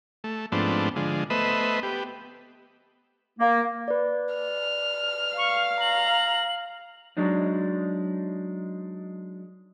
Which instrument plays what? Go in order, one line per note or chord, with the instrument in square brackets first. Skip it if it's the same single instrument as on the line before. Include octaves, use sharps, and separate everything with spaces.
[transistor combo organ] A3
G#2 F3 A3 B3 C4 D4
D3 F3 G#3
A3 B3 B4 C5 D#5 E5
B3 G4
[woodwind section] A#3
[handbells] B4 D5
[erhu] F6
[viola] F5 [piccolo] C#6
[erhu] A#5 [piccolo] F#7
[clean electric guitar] F#3 G#3 D4 D#4